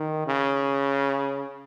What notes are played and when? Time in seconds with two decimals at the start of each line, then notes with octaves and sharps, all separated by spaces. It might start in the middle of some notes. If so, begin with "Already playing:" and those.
Already playing: D#3
0.27 C#3